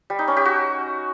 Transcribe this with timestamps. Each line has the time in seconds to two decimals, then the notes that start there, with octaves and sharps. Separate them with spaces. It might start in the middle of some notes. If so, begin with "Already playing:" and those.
0.10 G3
0.19 D#4
0.28 C#4
0.37 G4
0.45 F#4